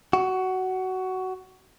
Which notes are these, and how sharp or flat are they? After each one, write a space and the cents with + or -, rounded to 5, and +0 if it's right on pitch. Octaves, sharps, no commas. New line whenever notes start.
F#4 +15